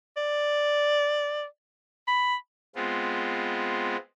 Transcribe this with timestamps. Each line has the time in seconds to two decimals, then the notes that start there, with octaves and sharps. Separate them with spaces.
0.17 D5
2.08 B5
2.76 G#3 B3 C4 F4